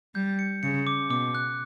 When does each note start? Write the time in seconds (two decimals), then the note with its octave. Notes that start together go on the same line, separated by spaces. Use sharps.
0.15 G3 G6
0.39 C#7
0.63 C#3 C#7
0.87 D6
1.10 B2 D6
1.35 F#6